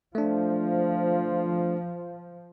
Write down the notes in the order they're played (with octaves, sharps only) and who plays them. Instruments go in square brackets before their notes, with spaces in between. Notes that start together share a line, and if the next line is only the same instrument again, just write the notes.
[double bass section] F3 [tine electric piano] A3 D4